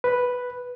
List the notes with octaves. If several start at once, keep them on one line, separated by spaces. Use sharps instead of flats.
B4